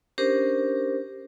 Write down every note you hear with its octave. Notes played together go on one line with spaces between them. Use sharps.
C#4 D4 G4 A#4 C5